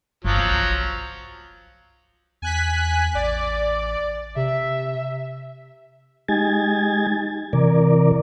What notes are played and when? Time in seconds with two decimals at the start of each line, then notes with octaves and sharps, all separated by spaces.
0.24 G1 F3 F#3
0.37 E3 B3
0.50 B1
2.42 E2 G#5 F#6 B6
3.15 A1 D5
4.36 C3 E5
6.28 G#3 D#4 G4 G#5 G#6 A6
7.53 C3 E3 A#4 D5